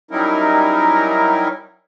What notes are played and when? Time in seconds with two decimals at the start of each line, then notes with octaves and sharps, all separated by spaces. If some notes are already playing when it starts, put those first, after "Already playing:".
0.11 F#3 G3 C#4 D#4 E4 A#4